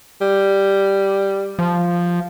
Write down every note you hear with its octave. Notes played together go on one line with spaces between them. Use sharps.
G3
F3